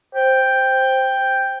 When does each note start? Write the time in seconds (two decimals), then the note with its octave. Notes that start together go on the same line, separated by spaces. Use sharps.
0.15 C5 G5